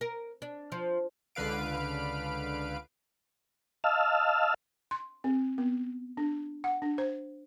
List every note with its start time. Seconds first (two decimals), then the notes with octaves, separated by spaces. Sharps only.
0.01 A#4
0.42 D4
0.72 F3
1.35 C#2 D3 B4 F5 D7
3.84 D#5 F5 A5 E6 F6
4.91 C6
5.24 C4
5.58 B3
6.17 D4
6.64 F#5
6.82 D4
6.98 C5